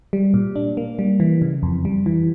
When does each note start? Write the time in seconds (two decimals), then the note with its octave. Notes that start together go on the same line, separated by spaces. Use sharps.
0.13 G3
0.34 A#2
0.56 D4
0.77 A#3
0.99 G3
1.20 E3
1.42 C#3
1.63 F2
1.85 G3
2.06 E3